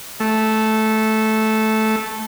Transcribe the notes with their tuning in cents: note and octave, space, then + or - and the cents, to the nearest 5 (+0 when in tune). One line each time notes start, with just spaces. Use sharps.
A3 -10